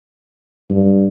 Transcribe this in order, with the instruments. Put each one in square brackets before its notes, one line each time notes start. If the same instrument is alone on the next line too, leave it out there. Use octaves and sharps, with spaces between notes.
[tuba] G2